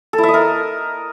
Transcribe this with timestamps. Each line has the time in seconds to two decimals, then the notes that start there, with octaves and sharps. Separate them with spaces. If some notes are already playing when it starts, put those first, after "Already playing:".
0.13 A4
0.18 E4
0.23 E5
0.29 D#5
0.34 A#4